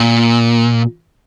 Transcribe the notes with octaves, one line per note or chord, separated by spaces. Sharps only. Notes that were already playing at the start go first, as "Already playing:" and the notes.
Already playing: A#2